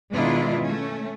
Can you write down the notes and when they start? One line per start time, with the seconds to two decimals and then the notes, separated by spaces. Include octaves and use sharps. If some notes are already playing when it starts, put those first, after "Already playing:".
0.11 B2 D#3 G#3 D4 E4 F4
0.63 A3 C#4